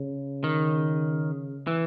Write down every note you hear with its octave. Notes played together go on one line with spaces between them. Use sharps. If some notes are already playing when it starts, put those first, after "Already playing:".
Already playing: C#3
D#3
E3